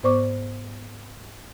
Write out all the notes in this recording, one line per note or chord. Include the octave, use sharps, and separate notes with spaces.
G#2 B3 C5 D5 C#6 D6